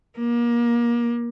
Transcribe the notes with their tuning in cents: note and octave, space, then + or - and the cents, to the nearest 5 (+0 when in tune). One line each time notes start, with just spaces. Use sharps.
A#3 +30